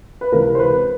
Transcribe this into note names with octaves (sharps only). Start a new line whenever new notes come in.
B4
C#2 C3 E3 A#4
C5
B4